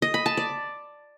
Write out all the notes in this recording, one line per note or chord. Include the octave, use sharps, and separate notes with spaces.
D#5
B5
A5
D5